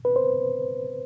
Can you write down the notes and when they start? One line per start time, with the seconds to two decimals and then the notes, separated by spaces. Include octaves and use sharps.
0.05 B4
0.16 C5